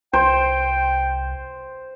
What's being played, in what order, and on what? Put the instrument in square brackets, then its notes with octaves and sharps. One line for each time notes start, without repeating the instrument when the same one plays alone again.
[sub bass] C2 [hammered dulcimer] C5 [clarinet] G5